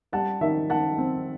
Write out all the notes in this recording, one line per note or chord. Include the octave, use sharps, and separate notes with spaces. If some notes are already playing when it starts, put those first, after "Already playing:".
G3 F#5 A5
D#3 E5
D#3 F#5 A5
C4